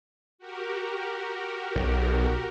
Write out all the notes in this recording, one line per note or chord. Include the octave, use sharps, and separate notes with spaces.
F#4 G4 A#4
B1